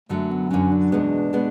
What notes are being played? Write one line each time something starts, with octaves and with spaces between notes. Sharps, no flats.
F#2 D3 F#3 A3
B3
F#2 D3 F#3 C#4
D4
E2 B2 G#3 B3
B2 G#3 B3